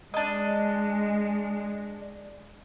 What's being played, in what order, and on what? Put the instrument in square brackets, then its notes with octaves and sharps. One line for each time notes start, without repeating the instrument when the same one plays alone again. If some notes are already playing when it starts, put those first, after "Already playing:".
[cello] G#3 [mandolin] D4 D#5